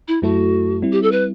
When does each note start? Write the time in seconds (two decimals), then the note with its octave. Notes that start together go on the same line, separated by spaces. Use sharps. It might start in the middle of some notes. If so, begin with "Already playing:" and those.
0.08 E4
0.22 F#2 F#3 A3 E4 F#4 A4
0.82 G3 C4 E4
0.92 G4
1.03 A4
1.12 B4